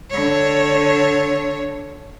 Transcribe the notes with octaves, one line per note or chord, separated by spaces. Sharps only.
D3 C#5